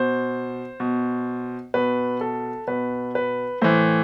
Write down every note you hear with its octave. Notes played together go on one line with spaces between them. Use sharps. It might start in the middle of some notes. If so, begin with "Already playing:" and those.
Already playing: B2 C5
B2
B2 B4
A4
B2 B4
B4
A2 E3 C5